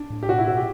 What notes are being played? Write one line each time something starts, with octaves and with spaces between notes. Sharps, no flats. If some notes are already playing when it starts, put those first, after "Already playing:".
Already playing: D4
A2
G4
B2 F#4
E4
B2 F#4
G4